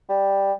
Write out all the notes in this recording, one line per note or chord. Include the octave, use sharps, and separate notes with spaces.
G3